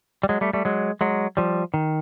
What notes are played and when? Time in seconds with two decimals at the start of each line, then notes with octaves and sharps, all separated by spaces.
0.23 G3
0.29 F#3 G#3
0.41 G3 A3
0.53 G3 A3
0.65 F#3 G#3
1.01 F#3 G#3
1.37 F3 G3
1.74 D#3